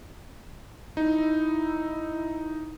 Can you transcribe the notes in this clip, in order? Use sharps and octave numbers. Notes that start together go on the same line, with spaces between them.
D#4 E4